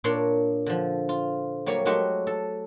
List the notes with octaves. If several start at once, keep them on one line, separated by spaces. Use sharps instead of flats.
A#2 D4 A#4 C#5 C6
D3 F3
F4
F#3 G3 A#3 C#5
F#3 G#3 A3 F#4 G4
A4